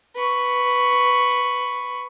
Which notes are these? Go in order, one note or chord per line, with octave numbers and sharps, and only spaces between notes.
B4 C#6